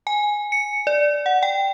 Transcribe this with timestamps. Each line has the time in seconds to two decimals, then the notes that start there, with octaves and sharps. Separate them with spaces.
0.07 G#5
0.52 C#7
0.87 D5
1.26 F#5
1.43 G5